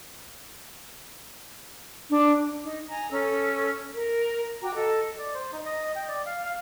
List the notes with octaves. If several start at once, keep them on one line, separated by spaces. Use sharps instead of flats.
D4
D#4
G#5 A#5
C#4 A4 E6
A#4
F#4 G5 A#5 D6
A4 D#5
D5
C5
D#4
D#5
G5
D5
F5
F5